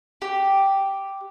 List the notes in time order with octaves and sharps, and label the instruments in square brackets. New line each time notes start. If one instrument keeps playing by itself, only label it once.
[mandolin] G4